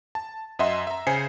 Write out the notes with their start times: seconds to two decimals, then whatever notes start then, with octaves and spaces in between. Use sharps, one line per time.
0.15 A5
0.59 F#2 D#5 E5 F#5 C6
0.87 E5 A#5
1.07 C#3 C5 G#5 C7 C#7